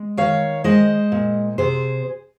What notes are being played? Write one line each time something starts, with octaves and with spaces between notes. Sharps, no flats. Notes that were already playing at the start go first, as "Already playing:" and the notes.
Already playing: G#3
D#3 C#5 F5
G#3 C5 D#5
A#2
C3 G#4 C5